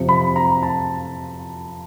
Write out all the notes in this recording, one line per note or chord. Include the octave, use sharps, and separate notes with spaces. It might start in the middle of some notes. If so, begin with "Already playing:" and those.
Already playing: F2 C3 F3
B5
A#5
A5